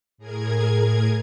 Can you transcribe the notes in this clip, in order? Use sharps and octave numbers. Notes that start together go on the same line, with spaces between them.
A2 G#4 A#4 G#6